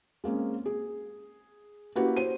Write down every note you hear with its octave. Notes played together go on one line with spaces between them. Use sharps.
G#3 A#3 C4 C#4
G#4
A#3 C#4 E4 F#4 G4 B4
C5 D#7